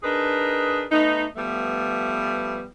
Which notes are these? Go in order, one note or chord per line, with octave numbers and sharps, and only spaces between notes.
D4 D#4 G#4 A#4 B4
A3 B3 D#4
F3 G3 A3 B3